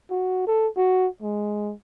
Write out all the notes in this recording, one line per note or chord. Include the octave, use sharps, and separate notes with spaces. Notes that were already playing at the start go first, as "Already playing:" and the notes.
F#4
A4
F#4
G#3